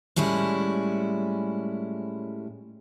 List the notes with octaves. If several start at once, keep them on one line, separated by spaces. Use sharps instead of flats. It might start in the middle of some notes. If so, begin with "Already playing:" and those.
A2 G3 G#3 C#4 E4